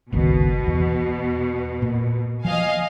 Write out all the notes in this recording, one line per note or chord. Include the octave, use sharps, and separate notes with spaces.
G1 C#2 B2 D#3
E2
A#2
F3 D#5 F5 G#5